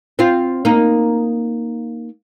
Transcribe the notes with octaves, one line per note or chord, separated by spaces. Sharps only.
C4 F4
A#3 D#4